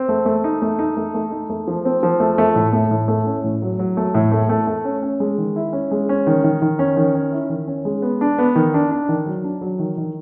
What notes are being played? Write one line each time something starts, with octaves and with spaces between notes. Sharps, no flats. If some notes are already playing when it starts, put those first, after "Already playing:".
Already playing: C4
A3
A3
D#4
A3
D#4
A3
A3
D#4
A3
F3
C4
F3
A3
A3
A2
A3
A2
A3
C#4
A2
F#3
F#3
A3
A2
A3
A3
A3
C#4
C#4
G#3
D#3
E4
C#4
G#3
C#4
D#3
D#3
D#3
C#4
D#3
C#4
E4
D#3
C#4
G#3
B3
D4
B3
D#3
D4
D4
D#3
F#3
D4
F#3
D#3
D#3